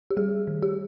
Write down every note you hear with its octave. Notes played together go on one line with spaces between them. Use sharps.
G4
G3 G#4
D#3
G4